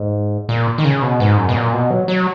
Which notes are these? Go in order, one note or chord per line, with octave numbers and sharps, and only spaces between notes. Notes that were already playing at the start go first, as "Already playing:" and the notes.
Already playing: G#2
A#2
D#3
C#3
B2
G#2
F#2
B2
A#2
B2
F#3
F#3